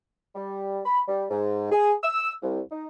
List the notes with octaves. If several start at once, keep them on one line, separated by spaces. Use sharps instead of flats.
G3
B5
G3
G#2
G#4
E6
C2
D#4